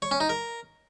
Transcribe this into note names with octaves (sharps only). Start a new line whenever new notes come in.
C#5
C#4
D#4
A#4